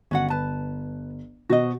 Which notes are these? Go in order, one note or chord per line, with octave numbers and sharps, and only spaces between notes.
G1 C#4 F#4 F#5
B4 A5
B2 F#4 C5 D#5